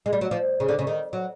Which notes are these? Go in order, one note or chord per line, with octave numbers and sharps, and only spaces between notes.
G#3
G3
F#3
F3
C#3
D3
C#3
D#3
F#3